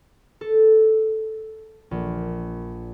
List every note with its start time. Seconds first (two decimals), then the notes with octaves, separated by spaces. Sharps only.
0.41 A4
1.91 A#1